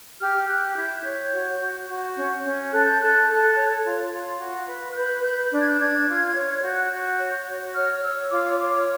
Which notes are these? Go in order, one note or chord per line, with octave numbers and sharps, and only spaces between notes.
G4 F6
G4 F#6
E4 G6
C#5 G6
F#4
F#4
F#4
C#4 G6
C#4
A4 F#6
G6
A4 F#6
A4
C#5
F4
F4
F#4
B4
F#6
B4 G6
B4 G6
D4
G#6
G6
D4 G#6
F4
C#5
F#4 G6
F#6
G6
F#4
C#5
F#4
C#5 F6
C#5 E6
F4 D6
C#5 D6